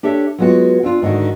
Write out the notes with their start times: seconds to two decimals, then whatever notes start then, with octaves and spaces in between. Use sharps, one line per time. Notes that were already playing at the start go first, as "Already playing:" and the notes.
0.03 D4 G4 A4 C#5 E5
0.38 F#3 G#3 B3 F4 F#4
0.83 C4 D4 F4
1.02 G#2 D3 D#3 F#4